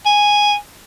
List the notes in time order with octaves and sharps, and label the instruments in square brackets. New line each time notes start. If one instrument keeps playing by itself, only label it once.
[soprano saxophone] G#5